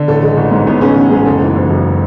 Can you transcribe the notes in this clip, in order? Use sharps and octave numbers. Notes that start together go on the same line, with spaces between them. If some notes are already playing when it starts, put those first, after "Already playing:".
Already playing: D3
A1 A4
G#3
A1
G#2
A1 B3
G#3 C#4
A1
G#2 G#4
F#1 A4
E3
F#1
F#2